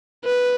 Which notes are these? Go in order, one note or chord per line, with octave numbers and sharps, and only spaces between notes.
B4